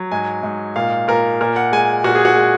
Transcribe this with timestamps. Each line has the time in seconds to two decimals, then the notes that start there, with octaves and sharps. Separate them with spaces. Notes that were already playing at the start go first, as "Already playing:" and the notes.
Already playing: F#3
0.12 G#2 G#5
0.43 G#2
0.76 A#2 F5
1.08 A#2 A#4
1.41 A#2 A#4
1.56 F#5
1.72 G#3 G#5
2.04 A#2 F#4
2.15 G#4
2.25 F#4
2.36 G#3